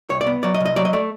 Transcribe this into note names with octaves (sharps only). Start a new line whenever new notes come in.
C2 C#5
D5
B3
F#3 D5
D#5
C2
D#5
F#3 D5
D#5
A3 D5